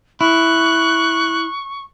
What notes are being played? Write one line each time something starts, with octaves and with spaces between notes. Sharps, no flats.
E4 C#6 F#6